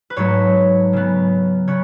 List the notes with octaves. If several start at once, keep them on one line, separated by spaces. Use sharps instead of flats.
B4
G#2 F#3 A3 C#5
C#3 F#3 B3
C#3 B3 C#5